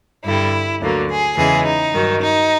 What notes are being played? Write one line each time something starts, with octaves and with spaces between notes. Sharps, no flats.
G2 D3 G3 E4
D2 D3 F#3 A#3
G#4
E2 C#3 E3 G#3 G#4
D#4
G2 D#3 F#3
D#4